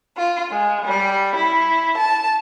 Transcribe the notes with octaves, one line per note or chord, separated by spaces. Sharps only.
F4
G#3
G3
E4
A5